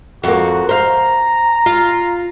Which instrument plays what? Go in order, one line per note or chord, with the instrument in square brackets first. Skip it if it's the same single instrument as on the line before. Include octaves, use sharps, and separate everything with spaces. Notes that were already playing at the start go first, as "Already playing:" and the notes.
[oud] F2 A#3 [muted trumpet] F#4
[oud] C5 F5 [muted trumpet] A#5
[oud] F4